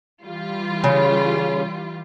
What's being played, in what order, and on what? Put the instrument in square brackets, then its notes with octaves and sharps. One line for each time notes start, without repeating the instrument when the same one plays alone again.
[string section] E3 G3 F4
[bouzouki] C#3